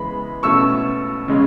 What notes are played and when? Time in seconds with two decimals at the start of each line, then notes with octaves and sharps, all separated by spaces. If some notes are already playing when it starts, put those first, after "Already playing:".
Already playing: C#3 E3 G#3 B3 B5
0.43 B2 A3 C#4 C#6 E6
1.28 C#3 G#3 C#4